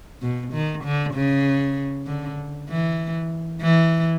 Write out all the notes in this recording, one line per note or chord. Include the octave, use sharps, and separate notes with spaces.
B2
D#3
D3
C#3
D3
E3
E3